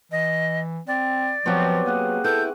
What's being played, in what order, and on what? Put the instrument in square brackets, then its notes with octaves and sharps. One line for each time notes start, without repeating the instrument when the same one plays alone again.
[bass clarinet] E3 [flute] D#5
[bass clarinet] C4 [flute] D5
[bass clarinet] F3 [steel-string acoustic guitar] F#3 B3 [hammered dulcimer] C4 F#4 G4
[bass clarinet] A#3 [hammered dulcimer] G#4 F#5 G#5
[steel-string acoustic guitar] E4 B4 [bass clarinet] A4 [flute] G6